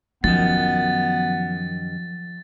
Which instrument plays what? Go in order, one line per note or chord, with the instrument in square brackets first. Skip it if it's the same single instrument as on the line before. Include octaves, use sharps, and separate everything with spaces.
[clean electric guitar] F#2 D#3 [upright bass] F3 [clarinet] B3 [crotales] A6